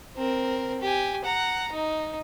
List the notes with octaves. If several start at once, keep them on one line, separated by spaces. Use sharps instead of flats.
C4 A#4
G4 G#5
F#5 A#5
D#4